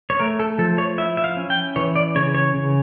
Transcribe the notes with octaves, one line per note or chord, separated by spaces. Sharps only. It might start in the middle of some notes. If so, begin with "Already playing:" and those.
C#5
A3 A#4
A4
F3 A4
C#5
E4 E5
E5
F5
C#4
G5
E3 C#5
D5
C#3 C#5
C#5
C#3